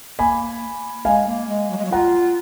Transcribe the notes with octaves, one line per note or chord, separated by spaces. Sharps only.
A#3 G#5 B5
G#3 F5 G#5
A#3
G#3
F#3
G#3
F#3
F4 F#5 A#5